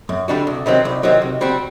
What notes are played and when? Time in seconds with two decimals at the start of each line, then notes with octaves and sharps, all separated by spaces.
0.09 F#2
0.28 D3 G3 D4 F#4
0.47 C2
0.66 C3 D#3 F#3 C4
0.85 C2
1.03 C3 D#3 F#3 C4
1.22 C3
1.41 G3 C4 F#4